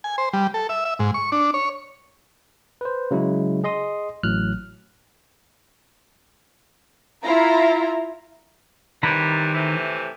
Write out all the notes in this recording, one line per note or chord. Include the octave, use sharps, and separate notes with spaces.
G#5
C5
G3
A4
E5
E5
G#2
C#6
D4
C#5
B4 C5
C#3 F#3 G#3 E4
G#4 D#5 C6 D#6
A1 A2 F#3 F6 F#6
E4 F4 A#5
C3 D#3 E3 G3 A#5 B5
A2 C3 E3